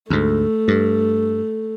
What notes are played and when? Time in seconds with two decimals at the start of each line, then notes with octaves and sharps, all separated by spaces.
0.10 D2 G#2 A3
0.68 G2